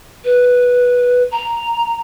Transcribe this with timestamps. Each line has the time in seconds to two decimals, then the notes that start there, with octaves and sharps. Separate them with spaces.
0.25 B4
1.32 A#5